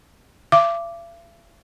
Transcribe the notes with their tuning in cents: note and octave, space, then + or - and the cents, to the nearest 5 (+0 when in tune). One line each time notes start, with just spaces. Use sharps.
E5 +45 D6 +0